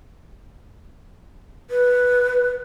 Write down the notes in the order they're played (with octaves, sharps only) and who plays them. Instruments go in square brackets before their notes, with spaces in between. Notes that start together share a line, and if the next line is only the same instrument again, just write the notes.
[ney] B4